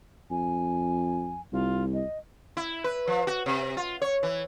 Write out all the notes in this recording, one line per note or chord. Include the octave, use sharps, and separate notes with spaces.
F2 G#5
C2 F4
D#5
E4
B4
F3
F#4
C3
F4
C#5
E3